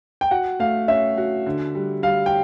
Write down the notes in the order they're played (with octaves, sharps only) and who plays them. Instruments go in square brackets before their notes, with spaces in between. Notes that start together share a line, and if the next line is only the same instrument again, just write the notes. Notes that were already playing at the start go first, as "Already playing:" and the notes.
[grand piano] G5
[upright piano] F#4 [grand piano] F#5
[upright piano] A3 [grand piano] F5
[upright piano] C#4 [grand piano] E5
[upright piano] F#4
D3
G3
[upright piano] G3 [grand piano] F5
[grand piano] G5